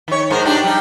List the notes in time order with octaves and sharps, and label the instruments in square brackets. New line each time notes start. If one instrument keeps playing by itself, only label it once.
[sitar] D#3 C#5
G#2 A#4 C5
D4 D#4 G4
G3 D#4